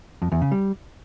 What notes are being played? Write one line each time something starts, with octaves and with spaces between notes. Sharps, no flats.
F2
E2
C#3
G3